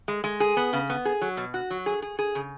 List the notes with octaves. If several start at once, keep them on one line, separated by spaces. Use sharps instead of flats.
G#3
G#3
G#4
B3
C#3
B3
G#4
F#3
B2
F#4
F#3
G#4
G#4
G#4
C#3